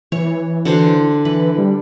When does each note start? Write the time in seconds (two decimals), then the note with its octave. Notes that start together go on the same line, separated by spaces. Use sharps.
0.12 E3 C#5
0.65 D3 F#4 C5
1.25 E3 B4
1.58 G3